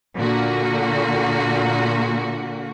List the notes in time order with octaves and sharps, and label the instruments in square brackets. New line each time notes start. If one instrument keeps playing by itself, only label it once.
[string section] A#2 D3 A#3 F#4